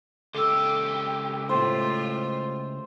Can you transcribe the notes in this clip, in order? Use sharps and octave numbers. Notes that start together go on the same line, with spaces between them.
C#2 G4 A4 E6
A2 F4 C5